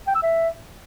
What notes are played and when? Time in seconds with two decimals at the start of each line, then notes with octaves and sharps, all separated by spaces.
0.07 G5
0.15 E6
0.23 E5